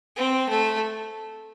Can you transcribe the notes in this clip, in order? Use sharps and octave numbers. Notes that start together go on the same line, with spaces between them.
C4
A3